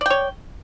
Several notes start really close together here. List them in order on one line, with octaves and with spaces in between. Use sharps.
D5 G5 C#5